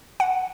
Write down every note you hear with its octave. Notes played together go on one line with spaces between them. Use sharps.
F#5